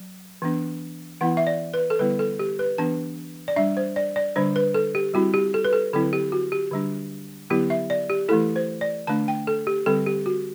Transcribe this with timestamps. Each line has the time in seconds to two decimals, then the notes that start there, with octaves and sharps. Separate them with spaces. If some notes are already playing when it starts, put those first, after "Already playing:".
Already playing: F#3
0.42 E3 B3 D4
1.21 E3 B3 E4 F#5
1.37 E5
1.47 D5
1.74 B4
1.90 A4
1.99 D3 G3 B3 E4 B4
2.19 A4
2.39 G4
2.59 B4
2.78 E3 B3 D4 A5
3.48 D5
3.56 G3 D4 E5
3.77 C5
3.96 D5
4.16 D5
4.36 D3 G3 D4 C5
4.56 B4
4.74 A4
4.95 G4
5.14 G3 C4 E4 F#4
5.34 G4
5.54 A4
5.64 B4
5.73 A4
5.93 D3 F#3 C4 E4 A4
6.13 G4
6.32 F#4
6.52 G4
6.71 D3 G3 D4
7.50 D3 F#3 B3 E4 G4
7.70 E5
7.90 D5
8.10 G4
8.29 E3 A3 E4 A4
8.56 C5
8.81 D5
9.07 D3 A3 D4 A5
9.28 G5
9.47 A4
9.67 G4
9.86 D3 G3 C4 A4
10.06 G4
10.26 F#4